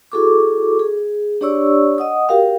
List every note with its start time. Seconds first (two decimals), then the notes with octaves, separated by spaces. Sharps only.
0.12 E4 F#4 G#4 A4 C#6 D6
0.79 G#4
1.41 D4 G4 C#5 D5 C#6 E6
1.98 D#5 F#5 D#6
2.28 F#4 G4 A#4 F5 G5